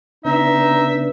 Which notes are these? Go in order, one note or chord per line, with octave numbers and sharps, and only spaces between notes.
C#3 B3 D4 D#4 E5